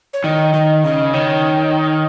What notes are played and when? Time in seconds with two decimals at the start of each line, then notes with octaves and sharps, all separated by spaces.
0.13 C#5
0.24 D#3 D#5
0.53 D#3 D#5
0.84 C#3 D#5
1.13 D#3 C#5